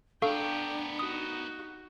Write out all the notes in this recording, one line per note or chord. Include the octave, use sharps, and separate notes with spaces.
B3 D4 A4 A#4 F5 G5 C#6
D#4 F#4 D#6